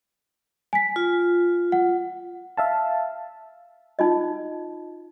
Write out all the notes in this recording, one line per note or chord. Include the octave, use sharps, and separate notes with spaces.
G#5 B6
F4
F#5
E5 F5 A5
D#4 F4 D#5